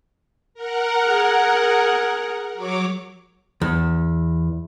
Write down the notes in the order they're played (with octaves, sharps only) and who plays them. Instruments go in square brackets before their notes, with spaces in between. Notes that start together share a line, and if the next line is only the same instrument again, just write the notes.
[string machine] A#4 F#5
[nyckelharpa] G#4
[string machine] F#3 C#5 D6
[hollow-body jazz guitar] E2